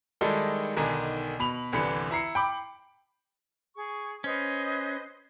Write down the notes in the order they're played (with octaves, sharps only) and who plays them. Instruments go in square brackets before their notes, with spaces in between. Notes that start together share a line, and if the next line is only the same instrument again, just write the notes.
[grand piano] D#3 G3 G#3 D#4 E4 A4
B1 D3 D#3 G#5 A#5
B2 B5 F7
G1 C2 D3 E3 B5 C#7
E4 A#5 C7 C#7
G5 B5 D6
[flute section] G#4 C#6
[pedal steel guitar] C#4 [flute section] B4 C5 D#5